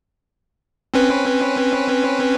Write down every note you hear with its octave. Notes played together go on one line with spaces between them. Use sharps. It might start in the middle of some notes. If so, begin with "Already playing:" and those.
C4 C#4 B4